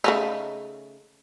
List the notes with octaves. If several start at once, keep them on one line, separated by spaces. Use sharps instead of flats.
C#3 A3 D#4